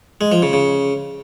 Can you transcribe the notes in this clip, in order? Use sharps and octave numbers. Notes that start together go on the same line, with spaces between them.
G#3
F3
C#3
C#3